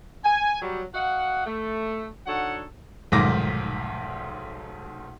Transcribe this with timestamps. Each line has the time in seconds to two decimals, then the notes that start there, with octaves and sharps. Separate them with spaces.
0.25 G#5
0.62 F#3 G3
0.93 F#4 D#5 F5 F#5
1.46 A3
2.27 D3 D#4 F#4 A4 C#5 F#5
3.12 F1 B1 G#2 D#3 D6 A#6